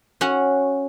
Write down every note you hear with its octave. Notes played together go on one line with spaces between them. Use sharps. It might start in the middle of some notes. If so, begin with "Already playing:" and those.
C#4 F#4 F#5